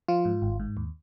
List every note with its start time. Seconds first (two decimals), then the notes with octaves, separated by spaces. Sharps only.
0.08 F3 F4
0.25 G#2
0.42 G#1
0.60 G#2
0.77 D#2